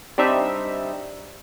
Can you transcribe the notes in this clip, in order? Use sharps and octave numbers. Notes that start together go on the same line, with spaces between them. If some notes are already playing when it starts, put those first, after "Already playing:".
G3 C4 D4 D#4 E5